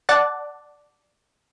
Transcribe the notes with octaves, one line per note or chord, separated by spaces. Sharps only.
D5 F#5 A5